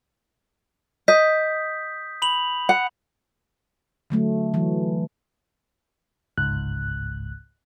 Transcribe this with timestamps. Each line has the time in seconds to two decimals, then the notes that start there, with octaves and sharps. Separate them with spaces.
1.08 D#5 D#6 G6 B6
2.22 B5 F7 F#7
2.69 F#5
4.10 D3 F#3 A3
4.54 E3 F#3
6.37 G1 C#2 G#2 F#6